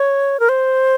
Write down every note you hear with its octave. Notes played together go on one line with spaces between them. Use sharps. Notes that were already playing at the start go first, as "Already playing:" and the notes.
Already playing: C#5
A#4
C5